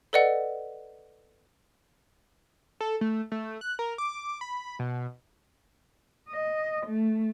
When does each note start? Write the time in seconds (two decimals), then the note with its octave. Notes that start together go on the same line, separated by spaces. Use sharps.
0.13 A4 B4 D5 D#5 F#5
2.80 A4
3.01 A3
3.32 A3
3.61 F#6
3.79 A#4
3.98 D6
4.41 B5
4.79 B2
6.29 D#5
6.86 A3